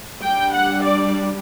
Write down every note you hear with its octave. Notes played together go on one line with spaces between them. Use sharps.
G3 D4 G5
F#5
D5